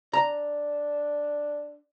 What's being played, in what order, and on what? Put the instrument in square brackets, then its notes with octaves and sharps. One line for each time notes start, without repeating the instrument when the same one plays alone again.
[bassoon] D4 [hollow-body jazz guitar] A#5